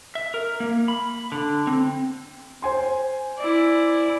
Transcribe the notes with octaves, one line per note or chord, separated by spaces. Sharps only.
E5
A#4
A#3
B5
D3
C4
C5 G#5 C6
E4 D5